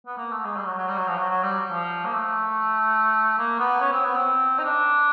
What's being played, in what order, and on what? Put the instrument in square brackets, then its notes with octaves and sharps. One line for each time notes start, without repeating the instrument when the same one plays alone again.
[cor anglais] B3
A#3
A3
G#3
G3
F#3
F#3
G3
F#3
F3
F#3
F#3
G3
F3
A#3
A3
A#3
B3
C#4
C4
B3
C4
D#4
D4